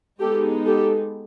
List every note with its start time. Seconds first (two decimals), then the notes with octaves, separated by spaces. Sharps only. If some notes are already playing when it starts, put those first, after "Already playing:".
0.20 G#3 B3 D#4 G4 A4
0.66 G4 A4